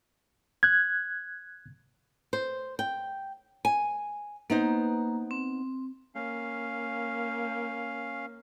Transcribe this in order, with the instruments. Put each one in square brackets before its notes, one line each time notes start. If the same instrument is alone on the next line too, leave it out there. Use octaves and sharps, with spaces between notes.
[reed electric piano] F#6 G#6
[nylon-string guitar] C5
G5
G#5
[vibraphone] A#3 A#5 [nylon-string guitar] B3 D#4 C5
[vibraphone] C4
[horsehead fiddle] A#3 [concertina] C#4 F5